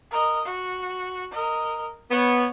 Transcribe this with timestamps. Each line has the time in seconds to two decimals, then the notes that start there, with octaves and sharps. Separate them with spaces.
0.11 A#4 D#5
0.45 F#4
1.31 A#4 D#5
2.11 B3 C#5